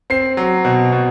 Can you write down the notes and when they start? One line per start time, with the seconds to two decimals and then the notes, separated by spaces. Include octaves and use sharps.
0.10 C4 C7
0.37 F#3
0.65 B2
0.93 B2